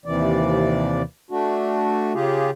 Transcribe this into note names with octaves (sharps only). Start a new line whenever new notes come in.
D#2 C3 E3 D5
A3 D4 F#4
C#3 F4 G4 G#4